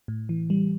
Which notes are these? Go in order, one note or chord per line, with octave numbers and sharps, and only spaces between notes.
A2
E3
G3